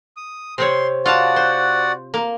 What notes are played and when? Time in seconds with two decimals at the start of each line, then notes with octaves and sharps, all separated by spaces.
0.17 D#6
0.58 C3 C4 C#5 C6
1.06 F4 F#4 D5 F5 F#5 A5
1.36 C5
2.14 A#3